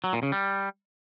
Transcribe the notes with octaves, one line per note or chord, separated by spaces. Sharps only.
F#3
A#2
C#3
G3